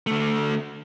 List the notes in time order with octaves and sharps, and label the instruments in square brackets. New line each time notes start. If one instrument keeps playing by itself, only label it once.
[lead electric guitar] D3 A3